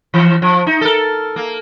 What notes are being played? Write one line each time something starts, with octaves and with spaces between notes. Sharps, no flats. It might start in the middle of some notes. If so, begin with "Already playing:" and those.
E3
F3
D#4
A4 A#4
A#3